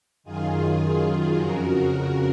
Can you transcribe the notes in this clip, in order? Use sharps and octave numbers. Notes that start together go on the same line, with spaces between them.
F#2 D#3 F4 G#4
F2 C#3 F#4 A#4